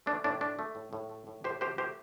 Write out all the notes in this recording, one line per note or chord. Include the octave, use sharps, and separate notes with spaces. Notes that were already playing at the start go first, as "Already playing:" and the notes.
A3 D4
A2 D4
A3 D4
A3
A2
A2
A3
A2
A2 G4 C5
A3 G4 C5
A3 G4 C5